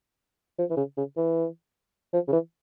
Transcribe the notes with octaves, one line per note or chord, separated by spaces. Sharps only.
F3
E3
C#3
C#3
E3
F3
C#3
E3